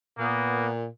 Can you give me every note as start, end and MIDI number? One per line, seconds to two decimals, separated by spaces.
0.19 0.87 46
0.19 0.68 58
0.19 0.68 59